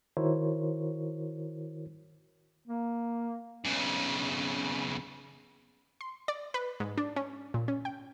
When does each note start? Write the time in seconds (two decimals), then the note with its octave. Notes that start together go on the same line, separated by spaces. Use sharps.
0.17 D#3 E4 F#4 A#4 C5 C#5
2.68 A#3
3.65 B1 C#3
6.01 C6
6.28 D5
6.54 B4
6.80 G#2
6.98 D4
7.16 C#4
7.54 A#2
7.68 C#4
7.85 G5